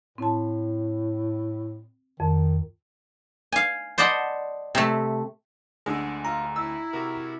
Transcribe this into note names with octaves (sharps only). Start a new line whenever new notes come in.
A2 C4 A5
F2 D#3
F5 G#5
C5 D5 D#5 F#5 A5 B5
C3 A3
D2 D3 G#3
F4 A#5
E4 E6
C3 F#4 A#4